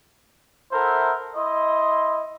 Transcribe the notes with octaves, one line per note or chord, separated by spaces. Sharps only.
E4 A4 A#4 C5 E5 F#5
E4 D#5 C6